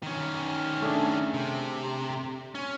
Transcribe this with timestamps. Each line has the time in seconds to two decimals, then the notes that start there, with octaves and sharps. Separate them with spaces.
0.03 D#3 C#4
0.82 A3 D4 G#4
1.34 C3
2.55 C#4